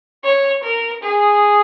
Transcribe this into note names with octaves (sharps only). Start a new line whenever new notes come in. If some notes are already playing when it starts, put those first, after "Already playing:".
C#5
A#4
G#4